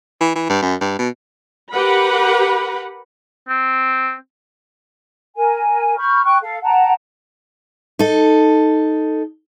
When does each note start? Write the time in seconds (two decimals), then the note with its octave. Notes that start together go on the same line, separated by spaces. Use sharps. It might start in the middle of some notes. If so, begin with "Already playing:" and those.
0.21 E3
0.35 E3
0.50 G2
0.62 F#2
0.81 G2
0.99 B2
1.73 G4 A#4 B4 F#5 B5
3.48 C4
5.37 A#4 G#5
5.97 B5 C#6 F6 G6
6.24 G5 C#6 F#6
6.42 A4 F5
6.63 F#5 G5 A5 A#5
7.99 D#4 A4